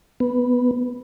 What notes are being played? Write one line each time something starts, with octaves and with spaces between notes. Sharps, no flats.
B3